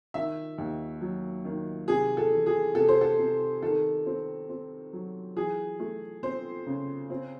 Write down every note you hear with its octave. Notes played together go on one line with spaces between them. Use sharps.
D#3 E5
D#2
F#3
D#3
C3 G#4
A4
E3
G#4
C3 A4
C5
A4
C3
D#3 A4
C4
C4
F#3
E3 G#4
A3
C4 C5
C#3
C4